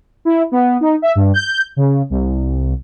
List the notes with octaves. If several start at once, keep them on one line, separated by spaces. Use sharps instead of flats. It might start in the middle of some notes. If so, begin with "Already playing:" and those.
E4
B3
D#4
E5
G2
G6
C#3
C2